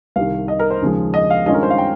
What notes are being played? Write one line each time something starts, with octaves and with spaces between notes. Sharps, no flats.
C2 C3 D#3 F5
D#5
A#4
C5
D#2 C#3 F3 G#3
D#5
F5
G2 D#3 G#3 C#4 F4 D#5
A#4
C5
F5
G5